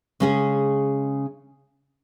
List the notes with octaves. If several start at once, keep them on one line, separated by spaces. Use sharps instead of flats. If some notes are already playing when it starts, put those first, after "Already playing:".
C#3 G#3 C#4 G#4